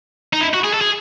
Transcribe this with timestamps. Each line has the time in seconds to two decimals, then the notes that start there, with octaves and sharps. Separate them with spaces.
0.33 D#4
0.41 E4
0.54 F#4
0.64 G#4
0.74 A4
0.82 G#4